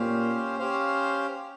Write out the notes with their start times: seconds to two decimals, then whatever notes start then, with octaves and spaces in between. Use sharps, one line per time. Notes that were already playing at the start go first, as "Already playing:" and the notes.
Already playing: A#2 C#4 G4 C5 F5
0.59 C#4 G4 C5 F5